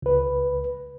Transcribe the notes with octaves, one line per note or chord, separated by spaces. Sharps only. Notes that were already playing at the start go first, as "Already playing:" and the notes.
C#2 B4